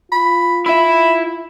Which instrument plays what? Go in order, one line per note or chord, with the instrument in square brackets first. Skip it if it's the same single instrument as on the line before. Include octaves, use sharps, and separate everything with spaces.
[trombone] F4 [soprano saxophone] B5
[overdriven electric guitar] E4 E5 [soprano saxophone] B5